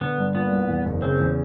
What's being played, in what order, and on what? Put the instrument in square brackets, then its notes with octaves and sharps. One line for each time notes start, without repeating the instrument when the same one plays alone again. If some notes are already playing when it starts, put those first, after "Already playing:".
[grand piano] D3 [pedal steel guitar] B3
[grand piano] G2
[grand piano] A#2 [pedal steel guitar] B3
[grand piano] C2
E2
F#1
[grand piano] C#3 [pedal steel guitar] C4
[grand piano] E2